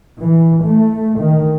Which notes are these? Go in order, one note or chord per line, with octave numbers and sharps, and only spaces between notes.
E3
A3
D#3